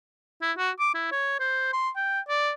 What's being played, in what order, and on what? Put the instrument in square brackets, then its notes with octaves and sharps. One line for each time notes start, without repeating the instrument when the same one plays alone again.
[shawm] E4
F#4
D6
E4
C#5
C5
C6
G5
D5